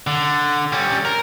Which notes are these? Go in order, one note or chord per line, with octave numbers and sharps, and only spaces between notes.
D3
G3 C#4
A#4